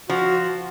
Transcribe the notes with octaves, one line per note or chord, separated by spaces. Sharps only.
F3 F#4